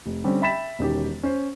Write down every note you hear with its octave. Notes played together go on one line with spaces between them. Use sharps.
F1
D3 G3 C4 C#4
E5 G5 B5 A6 B6 E7
E1 D#3 C#4 G4
C#4 C5